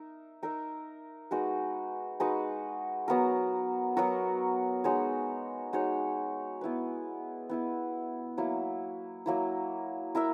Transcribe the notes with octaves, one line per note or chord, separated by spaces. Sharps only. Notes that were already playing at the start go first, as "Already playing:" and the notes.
Already playing: D#4 A#4 E5
D#4 A#4 E5
G#3 D#4 F#4 B4
G#3 D#4 F#4 B4
F#3 B3 F#4 A#4
F#3 B3 F#4 A#4
G#3 D#4 F#4 C#5
G#3 D#4 F#4 C#5
B3 E4 B4
B3 E4 B4
F#3 A#3 E4
F#3 A#3 E4
E4 A#4 E5